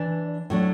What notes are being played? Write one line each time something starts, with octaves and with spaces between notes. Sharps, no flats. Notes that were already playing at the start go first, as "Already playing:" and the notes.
Already playing: E3 D4 D5
A2 F#3 A3 D4